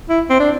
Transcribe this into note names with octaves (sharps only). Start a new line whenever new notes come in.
E4
C4
D4